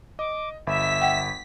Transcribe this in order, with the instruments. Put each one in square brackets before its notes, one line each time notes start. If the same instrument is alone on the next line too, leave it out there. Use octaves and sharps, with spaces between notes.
[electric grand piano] D#5 [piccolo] D6
[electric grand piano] G1 B5 [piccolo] E5 [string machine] B6
[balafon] F#5 G5